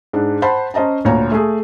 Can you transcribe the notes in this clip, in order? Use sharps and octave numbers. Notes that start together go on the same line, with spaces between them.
G#2 D4
C5 F#5 A5 B5
C#4 C5 D#5 A5 A#5
D2 A#2 C#5 A#5
A3 G#4